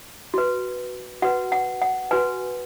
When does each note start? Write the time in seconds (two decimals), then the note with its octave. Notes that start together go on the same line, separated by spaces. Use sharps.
0.34 F#4 B4
1.22 F#4 B4 F#5
1.52 F#5
1.82 F#5
2.11 F#4 B4 G#5